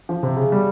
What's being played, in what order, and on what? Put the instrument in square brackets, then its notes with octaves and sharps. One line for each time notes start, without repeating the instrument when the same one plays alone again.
[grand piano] F3
C3
C#3
G3